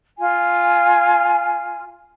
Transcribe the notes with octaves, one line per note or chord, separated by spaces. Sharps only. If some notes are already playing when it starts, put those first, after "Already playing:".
F4 G#5